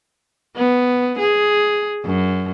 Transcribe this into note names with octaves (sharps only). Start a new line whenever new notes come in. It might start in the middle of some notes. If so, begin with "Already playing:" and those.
B3
G#4
F#2